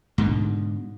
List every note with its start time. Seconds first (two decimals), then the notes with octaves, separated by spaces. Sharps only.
0.18 G#2 B2 D3